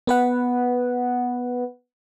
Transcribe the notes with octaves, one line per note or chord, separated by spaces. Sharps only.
B3 B4 F#5